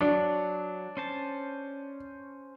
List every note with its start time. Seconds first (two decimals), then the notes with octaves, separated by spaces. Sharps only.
0.01 F#3 D4
0.97 C#4 C5 A5